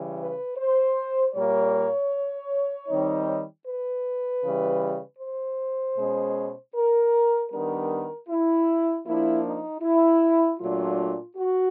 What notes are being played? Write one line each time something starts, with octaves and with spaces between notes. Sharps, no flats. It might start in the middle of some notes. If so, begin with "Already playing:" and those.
Already playing: C#3 E3 G3
B4
C5
A#2 G3 A#3 C#5
D#3 G3 C4 D#4
B4
C#3 E3 G3
C5
B2 G#3 C#4
A#4
D#3 G3 B3 D4 A#4
E4
F3 A#3 D4 E4
D#4
E4
A#2 F#3 A3 D4 F4
F#4